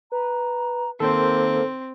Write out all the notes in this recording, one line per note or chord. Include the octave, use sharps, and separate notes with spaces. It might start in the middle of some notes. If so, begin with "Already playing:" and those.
B4 A#5
D#3 A#3 C4 A4 C5